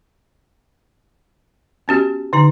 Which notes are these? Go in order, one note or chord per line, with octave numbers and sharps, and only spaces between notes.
B3 C#4 F#4 G4
D3 D#4 A#5